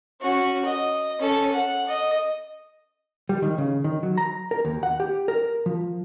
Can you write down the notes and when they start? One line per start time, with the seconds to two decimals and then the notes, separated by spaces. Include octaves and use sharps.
0.21 C#4 F#4
0.65 D#5
1.20 C#4 A4
1.52 F#5
1.88 D#5
3.29 G3
3.42 D#3
3.58 C#3
3.84 D#3
4.03 F#3
4.18 A#5
4.51 A#4
4.65 D#2
4.83 F#5
5.00 G4
5.28 A#4
5.66 F3